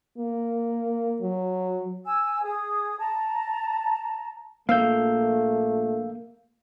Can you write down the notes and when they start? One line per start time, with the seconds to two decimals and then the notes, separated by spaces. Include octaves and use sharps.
0.18 A#3
1.21 F#3
2.05 G#5 E6
2.43 G#4 D#6
2.99 A5 A#5
4.69 A#1 A3 A#3 F5 E6 G6